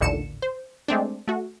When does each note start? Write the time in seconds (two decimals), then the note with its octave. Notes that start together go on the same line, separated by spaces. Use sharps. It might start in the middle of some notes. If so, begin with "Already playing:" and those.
0.01 A1 D#2 A#2 D3 C#7 E7
0.42 C5
0.88 G#3 A3 C4 D4
1.28 A3 F#4